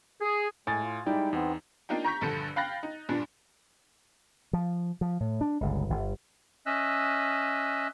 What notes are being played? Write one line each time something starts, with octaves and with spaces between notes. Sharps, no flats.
G#4
A2 G#3 G#5 A6
F4
G3 G#3 D#4 E4 D5 G5
E2 B3 C4
A#3 D4 D#4 F4 G5
A#5 C#6 G6 B6
A#1 G2 D3 A4 C#7
F5 G5 B5 F#6 A6 A#6
D#4
G2 A#2 D4
F3
F3
A2
D4
G1 C#2
G1
C#4 D#5 E5 E6 F#6